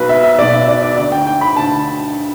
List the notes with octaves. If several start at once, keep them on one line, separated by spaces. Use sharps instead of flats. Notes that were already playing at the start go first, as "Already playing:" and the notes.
Already playing: B1 B2 B4
E5
E5
B1 B2 D5
E5
D5
D5
D2 D3 D5
G5
G5
B5
D2 D3 A5